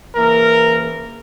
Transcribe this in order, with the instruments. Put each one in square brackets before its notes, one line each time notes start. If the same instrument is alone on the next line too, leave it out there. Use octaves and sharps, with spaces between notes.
[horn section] C#3 E3 A#3 A#4